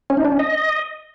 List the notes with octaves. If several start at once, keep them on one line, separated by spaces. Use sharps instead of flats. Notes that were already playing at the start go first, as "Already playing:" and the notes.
C#4
D#4
D4
C#4
D#5